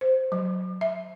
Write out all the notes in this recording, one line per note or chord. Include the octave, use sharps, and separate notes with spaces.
C5
F#3
E5